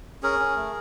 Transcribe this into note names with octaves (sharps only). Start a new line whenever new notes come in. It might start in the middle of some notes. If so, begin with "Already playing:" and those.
C#4 G#4 A#4
C#4
A3